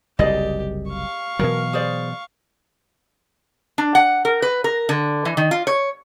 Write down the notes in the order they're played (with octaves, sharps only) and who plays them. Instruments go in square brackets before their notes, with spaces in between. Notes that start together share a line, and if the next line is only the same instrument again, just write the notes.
[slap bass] F#1 C2 [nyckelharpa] G4 [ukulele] G#4 D5 D#5
[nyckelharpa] F5 C#6
[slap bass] B2 E3 F#3 [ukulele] A#4
[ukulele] G#4 C5 D5
[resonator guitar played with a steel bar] D4
F#5
A#4
B4
A#4
D3
E3
D#3
F4
C#5